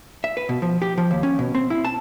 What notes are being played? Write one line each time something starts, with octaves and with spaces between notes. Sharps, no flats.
E5
B4
B2
F3
G4
F3
D#2
C#4
B2
C4
E4
A5